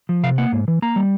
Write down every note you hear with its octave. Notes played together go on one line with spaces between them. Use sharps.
F3
C3 F5
A#3 F#5
G#2
E3
A#3 A#5
G3